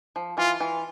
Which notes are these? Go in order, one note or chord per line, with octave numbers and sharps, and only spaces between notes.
F3
E3 F4
E3